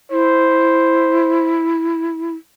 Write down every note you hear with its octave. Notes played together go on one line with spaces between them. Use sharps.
E4 C5